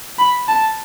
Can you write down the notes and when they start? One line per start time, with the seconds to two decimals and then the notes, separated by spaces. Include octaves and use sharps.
0.18 B5
0.48 A5